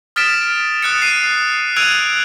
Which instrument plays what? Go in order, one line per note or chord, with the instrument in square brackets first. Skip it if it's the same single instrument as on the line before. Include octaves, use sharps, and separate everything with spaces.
[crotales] D#6 F6 A6 B6 D7 E7
D#6 F#6 A6 C#7
C7 D#7
E6 F#6 G#6 D7 D#7 F7